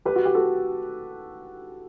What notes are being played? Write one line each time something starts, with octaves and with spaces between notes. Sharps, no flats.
G4 B4
F#4
G4
F#4 A4